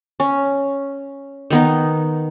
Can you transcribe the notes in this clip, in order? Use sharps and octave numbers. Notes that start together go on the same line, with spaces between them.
C#4
D#3 B3 D#4